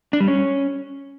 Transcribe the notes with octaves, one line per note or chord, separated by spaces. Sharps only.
D4
G3
C#4